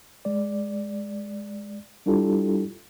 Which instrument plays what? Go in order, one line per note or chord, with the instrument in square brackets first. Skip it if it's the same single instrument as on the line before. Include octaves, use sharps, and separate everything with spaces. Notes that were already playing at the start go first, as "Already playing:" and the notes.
[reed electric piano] G#3 D5
G3 D4 E4 F4 G4 A4